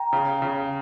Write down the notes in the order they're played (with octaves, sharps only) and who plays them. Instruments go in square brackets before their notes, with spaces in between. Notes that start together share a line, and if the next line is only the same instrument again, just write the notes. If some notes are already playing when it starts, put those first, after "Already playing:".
Already playing: [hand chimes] G5 A#5
[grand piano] C#3
C#3